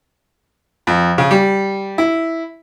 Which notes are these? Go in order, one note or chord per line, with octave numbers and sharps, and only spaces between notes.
F2
C#3
G3
E4